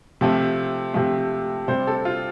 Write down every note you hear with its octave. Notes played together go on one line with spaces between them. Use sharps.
C3 F3 A3
C3 F3 A3
C3 G3 C5
A4
F4